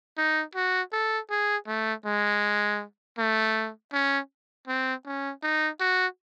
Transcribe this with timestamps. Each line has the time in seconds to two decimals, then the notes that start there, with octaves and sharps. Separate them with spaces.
0.18 D#4
0.55 F#4
0.93 A4
1.30 G#4
1.67 A3
2.05 G#3
3.18 A3
3.93 C#4
4.68 C4
5.06 C#4
5.43 D#4
5.80 F#4